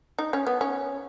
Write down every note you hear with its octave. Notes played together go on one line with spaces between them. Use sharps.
D#4
C#4
B3
C#4